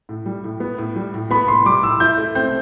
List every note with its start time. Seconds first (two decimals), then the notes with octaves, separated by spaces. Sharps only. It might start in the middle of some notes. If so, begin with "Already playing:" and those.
0.09 A2
0.26 G3
0.44 A2
0.60 B3
0.78 A2
0.96 G3
1.14 A2
1.31 B3 B5
1.48 A2 C6
1.66 G3 D6
1.83 A2 E6
2.00 E4 G6
2.18 A3
2.35 C4 G6